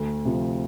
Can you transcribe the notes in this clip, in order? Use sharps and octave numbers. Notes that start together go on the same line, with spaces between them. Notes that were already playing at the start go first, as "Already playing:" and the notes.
Already playing: D2
C3 F3